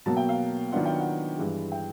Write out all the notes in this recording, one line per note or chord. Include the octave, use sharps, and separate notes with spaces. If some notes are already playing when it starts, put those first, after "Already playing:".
B2 F#3 A#3 A5
G5
F5
D#3 F#3 B3 D4 F4 F#5
G5
F#5
G2 E3 G#3
G5